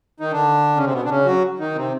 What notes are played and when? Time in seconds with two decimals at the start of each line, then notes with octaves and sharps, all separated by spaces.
0.20 D#3 D#4
0.32 D3 D4
0.77 C#3 C#4
0.84 C3 C4
0.92 B2 B3
1.05 D4
1.09 C#3 C#4
1.25 F#3 F#4
1.59 D#3 D#4
1.75 C3 C4